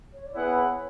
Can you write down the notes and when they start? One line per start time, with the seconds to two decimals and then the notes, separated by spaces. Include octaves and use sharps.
0.13 C#5
0.26 D5
0.34 B3 E4 G#4 B4 C#5 F#5